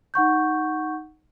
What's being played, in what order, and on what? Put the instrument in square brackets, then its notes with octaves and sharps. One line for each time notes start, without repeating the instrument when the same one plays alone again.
[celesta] D#4 F#5 C#6 G6